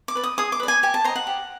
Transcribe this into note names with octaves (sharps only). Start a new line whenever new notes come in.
D6
B4 D5
D#6
G#4 D#6
D6
B4
D5 G#5
G4 G#5
A5
C5 D#5 A#5
F#5
G4